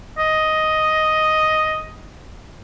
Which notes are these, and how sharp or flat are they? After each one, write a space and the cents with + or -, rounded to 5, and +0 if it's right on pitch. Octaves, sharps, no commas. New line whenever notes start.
D#5 +5